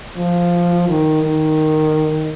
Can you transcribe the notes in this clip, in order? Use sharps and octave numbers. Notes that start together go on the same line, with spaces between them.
F3
D#3
D#3